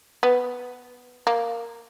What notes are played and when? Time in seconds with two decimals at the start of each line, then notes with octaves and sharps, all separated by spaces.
0.23 B3
1.27 A#3